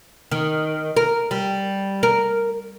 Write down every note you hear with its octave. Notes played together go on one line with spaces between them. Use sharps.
D#3
A#4
G3
A#4